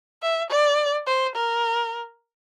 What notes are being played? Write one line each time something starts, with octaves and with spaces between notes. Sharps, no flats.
E5
D5
C5
A#4